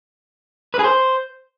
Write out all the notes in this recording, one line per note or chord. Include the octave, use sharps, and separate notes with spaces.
B4
G#4
C5